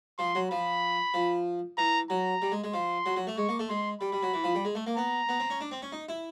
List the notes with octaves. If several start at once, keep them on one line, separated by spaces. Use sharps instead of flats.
F3 C6
F#3
F3 B5
F3
E3 A#5
F#3 A#5
G3
G#3
G#3
F3 C6
F#3
F#3
A3
G#3 C#6
A#3
A3
G#3 C6
G3 B5
G3
F#3
E3
F3
G3
G#3
A3
A#3
B3 A#5
B3
C4
C#4
D4
C4
C#4
D#4
E4